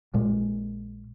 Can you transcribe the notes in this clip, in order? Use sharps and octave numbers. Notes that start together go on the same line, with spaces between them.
A#1 A#2 G#3